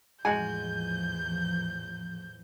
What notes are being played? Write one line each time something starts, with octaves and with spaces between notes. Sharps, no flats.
E2 A2 F3 G#3 F#4 G#5 G6